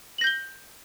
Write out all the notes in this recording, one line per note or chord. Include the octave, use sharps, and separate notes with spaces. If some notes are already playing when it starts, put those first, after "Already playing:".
G6 A#6 F#7 G7